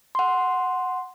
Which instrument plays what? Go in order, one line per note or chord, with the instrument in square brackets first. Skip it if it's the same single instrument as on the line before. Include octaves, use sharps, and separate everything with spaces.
[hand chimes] F#5 C6